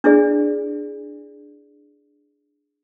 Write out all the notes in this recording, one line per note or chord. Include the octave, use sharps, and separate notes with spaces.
D4 E4 G#4 D5